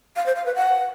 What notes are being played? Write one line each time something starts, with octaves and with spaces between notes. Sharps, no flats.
F5
C5
F5
B4
F#5